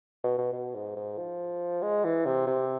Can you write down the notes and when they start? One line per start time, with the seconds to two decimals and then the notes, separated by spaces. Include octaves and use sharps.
0.24 B2
0.38 B2
0.52 B2
0.74 G#2
0.96 G#2
1.18 F3
1.82 G#3
2.04 E3
2.26 C3
2.47 C3